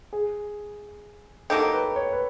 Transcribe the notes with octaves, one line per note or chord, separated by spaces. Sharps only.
G#4
F#3 A#3 D#4 G4 A4
B4
C#5
B4